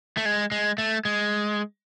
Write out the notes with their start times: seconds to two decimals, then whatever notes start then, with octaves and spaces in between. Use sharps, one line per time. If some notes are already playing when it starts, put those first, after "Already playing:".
0.17 A3
0.25 G#3
0.52 G#3
0.78 A3
1.05 G#3